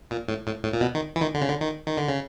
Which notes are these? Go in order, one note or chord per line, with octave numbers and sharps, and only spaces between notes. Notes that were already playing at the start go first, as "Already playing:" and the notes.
A#2
A2
A2
A2
A#2
B2
D#3
E3
D#3
D3
C#3
D3
D#3
D#3
D3
C#3